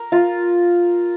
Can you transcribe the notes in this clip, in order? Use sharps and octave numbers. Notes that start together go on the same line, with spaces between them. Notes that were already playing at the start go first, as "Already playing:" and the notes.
Already playing: A#4
F4